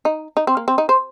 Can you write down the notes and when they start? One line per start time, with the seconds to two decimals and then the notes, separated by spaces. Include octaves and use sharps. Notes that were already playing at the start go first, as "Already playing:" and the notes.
0.05 D#4
0.37 D#4
0.47 C4
0.57 A#3
0.68 C4
0.78 D#4
0.89 C5